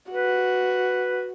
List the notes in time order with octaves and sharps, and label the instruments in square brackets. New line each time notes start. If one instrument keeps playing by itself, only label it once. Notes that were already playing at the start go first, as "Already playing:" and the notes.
[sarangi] F#4 [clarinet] B4